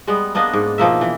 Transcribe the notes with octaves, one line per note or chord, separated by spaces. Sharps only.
G3 G#3 B3
A#3 B3 D4 D#5
G#2
B2 F3 A#3 E5
E3